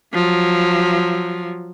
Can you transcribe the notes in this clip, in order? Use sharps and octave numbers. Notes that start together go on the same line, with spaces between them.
F3 F#3